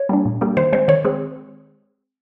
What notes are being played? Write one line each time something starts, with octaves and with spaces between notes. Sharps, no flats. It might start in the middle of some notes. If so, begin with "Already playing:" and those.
Already playing: C#5
G3 A#3 D4
A#2
G3 A#3 D4
D#3 C5
G#3 C4 C5
D#3 C#5
G#3 C4